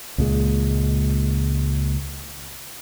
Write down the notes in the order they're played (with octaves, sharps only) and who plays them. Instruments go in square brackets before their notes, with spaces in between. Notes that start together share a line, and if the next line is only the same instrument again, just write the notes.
[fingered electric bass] C#2 A#2 G#3